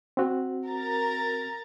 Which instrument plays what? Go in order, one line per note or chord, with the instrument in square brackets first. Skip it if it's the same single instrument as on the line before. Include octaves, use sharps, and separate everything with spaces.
[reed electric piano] C4 F#4
[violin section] A#4 A#5 A6